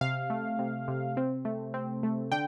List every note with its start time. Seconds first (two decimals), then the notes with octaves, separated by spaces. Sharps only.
0.01 C3 F5
0.30 A3
0.59 C3
0.88 C3
1.17 C4
1.45 A3
1.74 C4
2.03 A3
2.32 D3 G5